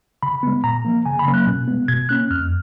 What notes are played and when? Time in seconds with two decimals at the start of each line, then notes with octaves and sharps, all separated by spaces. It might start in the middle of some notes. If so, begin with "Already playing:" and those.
0.23 C#3 B5
0.43 G#3 B3
0.64 A#2 A#5
0.85 F3 A#3
1.06 C#3 G#5
1.19 B5
1.27 F#3 A#3 C#4
1.34 F#6
1.47 B2
1.68 G#3 B3
1.88 B2 G#6
2.09 A#3 C#4 F#6
2.30 F2 F6